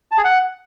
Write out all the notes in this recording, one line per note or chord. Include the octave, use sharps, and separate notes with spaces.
A5
G#4
F#5